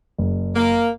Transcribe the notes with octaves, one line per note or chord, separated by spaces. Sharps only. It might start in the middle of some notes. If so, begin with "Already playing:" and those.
F#1
A#3